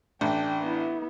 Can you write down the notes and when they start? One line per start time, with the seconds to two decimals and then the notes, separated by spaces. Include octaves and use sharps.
0.21 A1 D4 G5
0.62 B3 E4